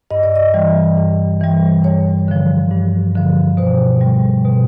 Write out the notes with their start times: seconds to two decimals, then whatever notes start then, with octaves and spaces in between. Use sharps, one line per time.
0.11 G2 D#5
0.23 D5
0.36 D#5
0.54 E3 G3
0.98 G2
1.41 E3 G3
1.84 G2 C#5
2.28 D3 F3
2.71 G2
3.15 D3 F3
3.57 B2 C5
4.01 G3
4.45 B2